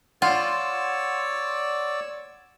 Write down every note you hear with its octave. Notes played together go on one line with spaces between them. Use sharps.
F4 C#5 D5 F#5 C6 E6